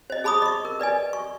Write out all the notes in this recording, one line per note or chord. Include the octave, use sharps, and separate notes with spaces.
C5 D#5
G#4 A5 B5 D6 D#6
D#5 C#6
A#4
B4 D5 D#5 G#5
C#6